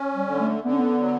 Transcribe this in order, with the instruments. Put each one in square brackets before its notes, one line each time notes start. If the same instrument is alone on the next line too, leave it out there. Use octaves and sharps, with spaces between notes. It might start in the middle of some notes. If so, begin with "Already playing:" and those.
Already playing: [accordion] C#4
[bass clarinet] G3
[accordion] D3
[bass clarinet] A3
[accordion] D3 [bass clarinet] B3
[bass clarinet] C#4
B3
[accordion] F#3